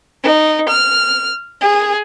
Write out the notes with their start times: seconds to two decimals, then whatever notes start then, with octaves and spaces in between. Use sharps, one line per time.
0.24 D#4
0.69 F6
1.61 G#4